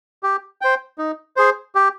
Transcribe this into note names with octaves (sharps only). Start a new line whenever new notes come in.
G4
C5 G5
D#4
G#4 C5
G4